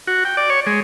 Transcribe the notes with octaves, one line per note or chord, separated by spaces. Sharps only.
F#4
G5
D5
C#5
G#3